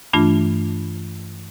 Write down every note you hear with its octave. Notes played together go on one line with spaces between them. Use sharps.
G2 E3 A3 D4 F4